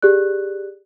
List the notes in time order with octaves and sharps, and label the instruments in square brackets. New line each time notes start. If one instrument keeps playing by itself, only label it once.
[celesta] G4 G#4 D5 F#6